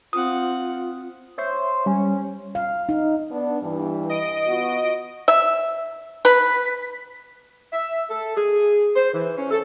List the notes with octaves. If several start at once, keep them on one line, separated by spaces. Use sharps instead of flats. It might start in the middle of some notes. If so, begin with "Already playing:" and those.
C4 F4 F#5 D#6
C5 C#5 E5 C#6
G3 C#4
F5
D#4
B3 D4
G2 E3
D#5 D7
B3 F4 F#4
E5
B4
E5
A4
G#4
C5
E3
C#4
A4